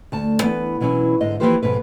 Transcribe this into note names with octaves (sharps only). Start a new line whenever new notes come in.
D2 A5
E3 B3
B2 E3 F#3 C#4 D#4
G#2 D3 D#5
E3 F3 A#3 G4 B4 C5
F2 G#2 B2 B4